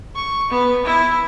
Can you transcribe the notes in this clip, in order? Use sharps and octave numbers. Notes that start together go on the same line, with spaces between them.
C#6
B3
E4